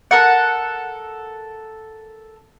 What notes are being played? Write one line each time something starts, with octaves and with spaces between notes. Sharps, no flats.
A4 A#4 F#5